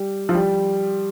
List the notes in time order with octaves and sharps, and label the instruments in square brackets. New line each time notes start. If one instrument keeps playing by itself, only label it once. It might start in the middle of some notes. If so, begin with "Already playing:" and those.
Already playing: [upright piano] G3
F3
G3